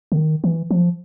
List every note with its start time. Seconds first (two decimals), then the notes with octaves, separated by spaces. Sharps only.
0.12 D3
0.17 D#3
0.44 E3
0.71 F3